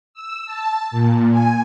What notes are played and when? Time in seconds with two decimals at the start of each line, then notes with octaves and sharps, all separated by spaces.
0.14 E6
0.46 A5
0.91 A#2
1.31 G#5